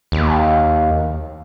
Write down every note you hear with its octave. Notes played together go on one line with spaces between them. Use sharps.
D#2